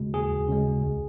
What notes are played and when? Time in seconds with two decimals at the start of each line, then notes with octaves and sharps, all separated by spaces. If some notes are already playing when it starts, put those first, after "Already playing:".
Already playing: D#2 C#3 G#3 F#4
0.14 D#2 G#4
0.48 C#3 G#3
0.82 C#2